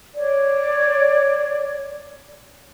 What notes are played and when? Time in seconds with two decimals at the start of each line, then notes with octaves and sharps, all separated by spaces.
0.14 C#5 D5